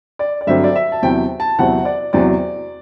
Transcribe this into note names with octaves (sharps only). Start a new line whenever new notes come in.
D5
D5
G2 D3 F#3 C4 E5
D5
E5
A5
E2 C3 F#3 C4 G5
A5
E2 C3 F#3 C4 F#5
D5
E2 C3 F#3 C4 D5